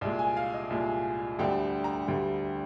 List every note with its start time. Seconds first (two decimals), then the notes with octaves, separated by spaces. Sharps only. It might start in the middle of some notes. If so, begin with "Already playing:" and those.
0.01 C2 A#2 G#3
0.19 G#5
0.37 F5
0.54 D#5
0.70 C2 A#2 G#3
1.39 D2 D3 G3 G5
1.84 A#5
2.08 D2 D3 G3